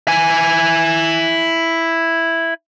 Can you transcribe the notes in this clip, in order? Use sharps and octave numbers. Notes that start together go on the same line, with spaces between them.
E4 G#5